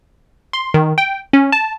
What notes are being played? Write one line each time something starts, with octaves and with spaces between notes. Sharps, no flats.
C6
D#3
G5
C#4
A5